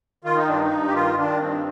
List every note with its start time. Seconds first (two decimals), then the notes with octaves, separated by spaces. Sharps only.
0.24 D#3 F4
0.36 D#4
0.48 G2 D4
0.61 D#4
0.71 G2
0.88 G4
0.94 D#3 F4
1.17 D#3 D4
1.41 G2 C4